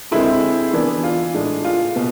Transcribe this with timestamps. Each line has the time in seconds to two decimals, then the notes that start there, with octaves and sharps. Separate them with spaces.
0.11 D3 G#3 C4 E4
0.73 E3 B3 D4
1.04 F4
1.34 A2 G#3 D4
1.65 F4
1.96 B2